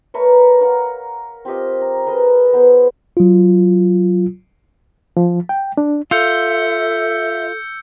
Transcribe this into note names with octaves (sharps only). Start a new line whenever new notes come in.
A3 A#4 B4 C#5
A#4 F5 F#5
C4 F4 G4 D#5
A#5
G#4 A#4 B4 D#5
B3 C5
F#3 F4
F3
G5
D4
F4 A4 E5 E6 G6 C#7